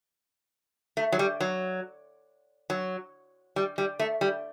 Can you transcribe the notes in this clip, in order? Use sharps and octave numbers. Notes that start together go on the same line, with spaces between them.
A3
F#3
G3
F#3
F#3
G3
G3
A3
G3